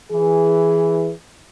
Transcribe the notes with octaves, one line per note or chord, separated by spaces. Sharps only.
E3 G#4